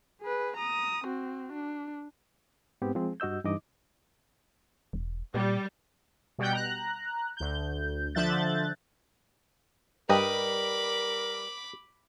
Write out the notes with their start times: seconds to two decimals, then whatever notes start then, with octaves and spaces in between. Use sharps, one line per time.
0.21 G#4 B4
0.57 A#5 D#6
1.05 C4 F#4
1.53 D4
2.82 G#2 B3 C4 G4
2.95 F3 G#3 C4 G#4
3.20 G2 F#4 D#5 E6 G6
3.45 G2 E3 D#4 D#5 D6
4.93 E1
5.34 A#2 G3
6.38 B2 G3 F#5 G5 G6
6.53 A#5 F#6
7.37 D2 G6
8.15 D3 F3 E5 F#6 G6 A6
10.09 G2 G3 A#4 B4 D#5 B5 D6